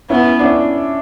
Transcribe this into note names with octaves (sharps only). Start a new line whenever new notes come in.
B3 C#4 E4
D4
C#4 E4